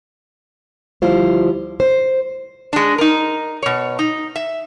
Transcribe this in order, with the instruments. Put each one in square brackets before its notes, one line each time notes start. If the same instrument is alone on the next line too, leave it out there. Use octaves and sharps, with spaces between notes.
[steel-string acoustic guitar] D2 F3 G3 E4 F4 C5
C5
[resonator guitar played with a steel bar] G#3 D4
D#4 A#4
B2 C#5
D#4
E5